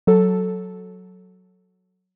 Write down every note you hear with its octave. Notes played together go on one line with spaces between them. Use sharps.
F#3 A4